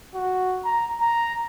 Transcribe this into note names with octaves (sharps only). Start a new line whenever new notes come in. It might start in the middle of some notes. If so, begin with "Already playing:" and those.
F#4
A#5
A#5